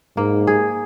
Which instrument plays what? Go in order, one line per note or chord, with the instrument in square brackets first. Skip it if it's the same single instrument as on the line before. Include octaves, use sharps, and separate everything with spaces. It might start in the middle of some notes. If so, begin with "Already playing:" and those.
[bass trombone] G#2 [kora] A#3
[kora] G#4